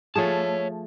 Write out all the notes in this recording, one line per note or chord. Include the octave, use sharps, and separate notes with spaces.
F3 A3 G#4 C#5 A5